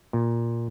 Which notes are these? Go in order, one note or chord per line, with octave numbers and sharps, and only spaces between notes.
A#2